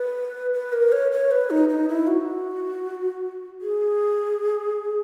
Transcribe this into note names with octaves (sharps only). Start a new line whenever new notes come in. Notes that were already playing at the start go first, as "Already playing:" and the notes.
Already playing: B4
B4
A#4
C#5
C#5
B4
D#4
D#4
E4
F#4
G#4